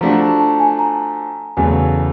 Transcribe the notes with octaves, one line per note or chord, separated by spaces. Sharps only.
F3 A3 D4 F#4 A#5
A#5
A5
A5
G#5
A#5
E2 C#3 F#3 A3 G#5